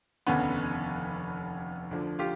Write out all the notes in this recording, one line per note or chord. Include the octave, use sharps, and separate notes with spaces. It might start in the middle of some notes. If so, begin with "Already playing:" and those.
F1 D#2 D3 B3 C#4
D2 D3 F3
F4 G4